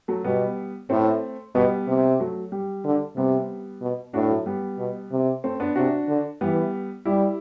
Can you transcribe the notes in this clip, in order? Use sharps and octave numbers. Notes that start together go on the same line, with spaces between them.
F#3 A3
B2 G3 B3
A2 A3 C4
B2 G3 B3
C3
F#3 A3
G3
D3
C3 G3 B3
B2
A2 D4 F#4
F#3 A3
G3 B3
B2
C3
A3 C4
B3 D4
C3 D4 F#4
D3
E3 G3 B3
G3 E4 G4